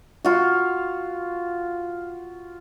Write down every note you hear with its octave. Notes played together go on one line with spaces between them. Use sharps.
F4 F#4